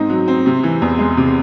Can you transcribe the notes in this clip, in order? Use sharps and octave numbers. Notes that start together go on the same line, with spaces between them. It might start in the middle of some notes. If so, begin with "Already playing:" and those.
Already playing: G#2 C4 D#4
F#3
C4
C3
E3
E2
G#3
C3